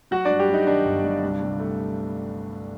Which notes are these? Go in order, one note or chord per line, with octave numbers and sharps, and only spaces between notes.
F#3 F#4 F#5
D4 D5
G2
G3 G4
F#3 D#4
D#3 D4
G1
G2
C2
C2
A3